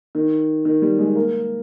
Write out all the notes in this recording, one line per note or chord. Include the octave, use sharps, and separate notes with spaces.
D#3
D#3
G3
G#3
A#3